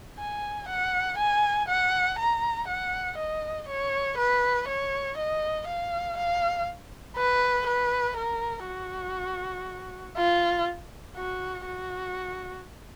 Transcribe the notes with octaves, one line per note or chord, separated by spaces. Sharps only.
G#5
F#5
G#5
F#5
A#5
F#5
D#5
C#5
B4
C#5
D#5
F5
F5
B4
B4
A#4
F#4
F4
F#4
F#4